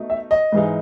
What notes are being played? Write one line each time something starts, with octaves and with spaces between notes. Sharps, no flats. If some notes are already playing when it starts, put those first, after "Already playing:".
Already playing: B2 A3 D#4
E5
D#5
G#2 E3 G#3 D#4